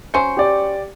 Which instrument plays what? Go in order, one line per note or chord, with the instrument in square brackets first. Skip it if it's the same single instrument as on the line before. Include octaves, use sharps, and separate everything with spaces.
[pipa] F#3 C#4 C5 [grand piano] C#7
[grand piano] G4 D5